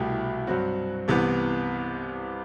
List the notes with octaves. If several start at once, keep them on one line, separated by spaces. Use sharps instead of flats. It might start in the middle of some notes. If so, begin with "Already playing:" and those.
Already playing: C2 B2 A3 E4 G4
G2 F#3 C4 F#4
C2 C3 E3 B3